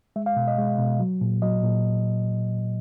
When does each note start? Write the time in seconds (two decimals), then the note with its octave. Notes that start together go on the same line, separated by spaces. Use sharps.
0.16 G#3 E5
0.26 F5
0.37 B2
0.48 D#5
0.58 G#3
0.79 B2
1.00 F#3
1.21 A#2
1.42 F#3 D#5
1.63 A#2